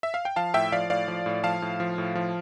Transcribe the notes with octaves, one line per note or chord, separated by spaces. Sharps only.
E5
F5
G5
F3 F5 A5
A2 E5 G5
F3 D5 F5
A2 D5 F5
F3
A2
F3 F5 A5
A2
F3
A2
F3